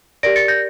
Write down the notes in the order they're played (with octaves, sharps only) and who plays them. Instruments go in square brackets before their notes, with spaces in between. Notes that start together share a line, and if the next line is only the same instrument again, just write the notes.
[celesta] G4 A#4 D5 A#6 D7
A6 C#7
G6 A#6